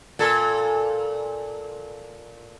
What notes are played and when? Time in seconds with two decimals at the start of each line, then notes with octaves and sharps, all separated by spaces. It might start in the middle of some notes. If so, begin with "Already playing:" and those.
0.19 A#2 A4